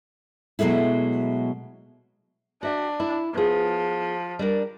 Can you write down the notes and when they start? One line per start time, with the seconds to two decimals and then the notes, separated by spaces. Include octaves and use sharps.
0.59 B2 F#3 G#3 A3 E4
2.63 D4 F#4 E5 G5
3.00 E4
3.34 F3 B3 G#4
4.39 G3 D4 A#4